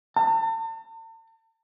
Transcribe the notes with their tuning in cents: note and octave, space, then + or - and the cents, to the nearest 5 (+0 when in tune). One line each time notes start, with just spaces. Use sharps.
A5 +45